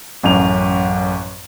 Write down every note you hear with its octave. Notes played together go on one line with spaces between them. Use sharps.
A1 F#2 F7